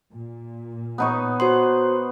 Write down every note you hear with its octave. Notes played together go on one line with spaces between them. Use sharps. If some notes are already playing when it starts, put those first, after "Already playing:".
A#2
B3 D#4 C#5
F#4 C5 C6